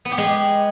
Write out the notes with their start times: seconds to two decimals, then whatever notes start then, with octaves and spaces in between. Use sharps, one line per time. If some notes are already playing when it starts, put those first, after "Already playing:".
0.05 B3
0.12 G4
0.18 G#3